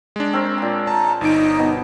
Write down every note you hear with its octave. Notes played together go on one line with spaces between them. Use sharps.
G#3 D4
C4 A#4 C#5
A#2 G#5
A5 A#5
G1 D#4 D7
B2